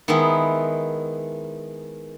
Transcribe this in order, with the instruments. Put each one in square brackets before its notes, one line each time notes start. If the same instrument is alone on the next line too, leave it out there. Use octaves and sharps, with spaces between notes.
[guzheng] D#3 G#3 B3 E4